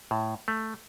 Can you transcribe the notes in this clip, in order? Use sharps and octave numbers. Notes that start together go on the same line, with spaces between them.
A2
A3